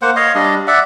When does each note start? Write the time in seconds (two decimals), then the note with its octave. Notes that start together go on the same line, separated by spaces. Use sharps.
0.02 A#3 C5 F#5
0.16 C#5 D#5 F5
0.35 G3 D4 D#5
0.67 D5 E5 F#5